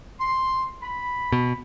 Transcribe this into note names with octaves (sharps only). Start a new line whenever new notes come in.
C6
B5
B2